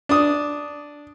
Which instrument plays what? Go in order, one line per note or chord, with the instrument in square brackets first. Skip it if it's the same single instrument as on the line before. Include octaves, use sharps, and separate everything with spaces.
[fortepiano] D4 D#6